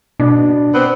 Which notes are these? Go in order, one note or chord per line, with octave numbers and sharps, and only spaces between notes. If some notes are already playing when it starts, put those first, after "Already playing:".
B2 D4
B3 C4